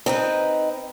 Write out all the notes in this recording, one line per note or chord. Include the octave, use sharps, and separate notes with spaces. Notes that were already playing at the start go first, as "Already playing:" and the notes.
C4 D#4 B4